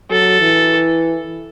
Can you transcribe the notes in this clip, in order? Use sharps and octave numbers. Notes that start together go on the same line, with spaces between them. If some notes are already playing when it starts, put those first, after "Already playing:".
F#3 A4
E3